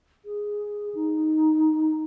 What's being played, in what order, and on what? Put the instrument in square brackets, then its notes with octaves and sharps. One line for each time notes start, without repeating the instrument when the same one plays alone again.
[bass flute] G#4
D#4